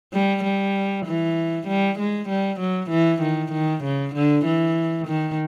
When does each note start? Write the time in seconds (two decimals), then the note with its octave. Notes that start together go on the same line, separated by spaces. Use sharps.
0.13 G3
0.44 G3
1.06 E3
1.67 G3
1.99 G#3
2.29 G3
2.60 F#3
2.90 E3
3.22 D#3
3.52 D#3
3.84 C#3
4.15 D3
4.45 E3
5.07 D#3